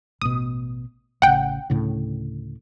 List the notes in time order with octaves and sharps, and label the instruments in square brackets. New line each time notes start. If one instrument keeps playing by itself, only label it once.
[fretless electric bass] A1 B2 [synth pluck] D#6
[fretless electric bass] A1 C#3 [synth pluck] F#5 G5
[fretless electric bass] D2 A2 C#3